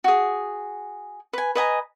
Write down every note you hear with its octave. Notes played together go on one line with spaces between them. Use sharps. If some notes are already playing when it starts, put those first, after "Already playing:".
F#4 G#4
B4 G#5
B4 D#5 G#5 A#5